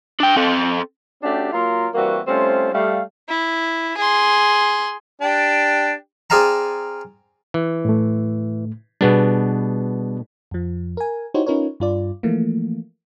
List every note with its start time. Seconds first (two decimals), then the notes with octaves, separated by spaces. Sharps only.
0.20 D4 G5
0.37 C4 A4
1.23 A3 C#4 D4 F#4 G4
1.53 F#3 A#3 F4 A#4 A#5 C6
1.95 E3 G3 A#3 C4 F#4
2.27 G3 A3 C4 C#4 F4 C5
2.73 G3 A3 F5
3.29 E4
3.97 G#4 C6
5.22 D4 G4
6.30 C4 G#4 D5 F5 A5 A#5
7.54 E3
7.85 A2 A3
9.01 B2 G3 B3 D4 G#4
10.51 F2 F3
10.97 A#4 G#5
11.34 D#4 E4 F#4 G4 C5 C#5
11.46 C#4 D#4 F4 A#4 B4 C#5
11.80 G2 F4 D5
12.23 E3 F3 A3 A#3